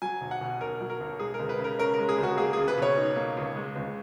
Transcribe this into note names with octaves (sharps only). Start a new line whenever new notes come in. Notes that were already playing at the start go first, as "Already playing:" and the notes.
F#3 G#5
B1
F#5
B2
B1 A#4
F#3
A#4
B1
G#3 G#4
A#4
C#2
B4
C#3
A#4
C#4 A#4
G#3 A#4
G#4
C#2 F#4
A#3 G#4
C#2 G#4
B4
B2 C#5
D#4
A#3
C#2
G#3
C#2